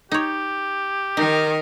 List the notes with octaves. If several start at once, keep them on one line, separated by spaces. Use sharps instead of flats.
D#4 G4 C#5
D#3 D#4 A#4